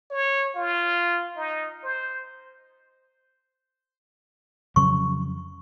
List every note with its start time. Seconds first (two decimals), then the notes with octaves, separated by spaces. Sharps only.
0.11 C#5
0.56 F4
1.37 D#4
1.84 C5
4.76 F2 C#3 F#3 C#6